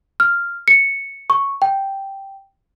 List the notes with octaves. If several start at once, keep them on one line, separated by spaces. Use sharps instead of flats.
F6
C#7
C#6
G5